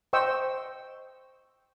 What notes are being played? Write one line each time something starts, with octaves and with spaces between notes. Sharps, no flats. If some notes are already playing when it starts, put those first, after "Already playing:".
C5 D#5 G5 C#6 E6